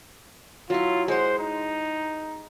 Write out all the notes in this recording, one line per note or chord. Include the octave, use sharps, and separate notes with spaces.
F#3 E4 F4
G#3 C5 F#5
D#4